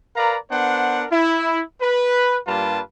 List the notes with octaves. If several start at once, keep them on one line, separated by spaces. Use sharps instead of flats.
A#4 B4 D5 F5 A#5
B3 D4 A#4 C5 F#5
E4
B4
G2 G3 A#3 F4 B4 A5